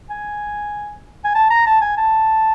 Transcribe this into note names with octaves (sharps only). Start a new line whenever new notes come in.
G#5
G#5
A5
A#5
A5
G#5
A5